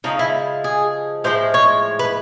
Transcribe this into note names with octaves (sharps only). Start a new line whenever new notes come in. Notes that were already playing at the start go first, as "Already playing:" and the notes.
C#3 F3 G#3 D#4
E4
G#4
A2 F3 G#3 C5
C#5
B4